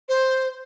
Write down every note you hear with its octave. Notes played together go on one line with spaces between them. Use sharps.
C5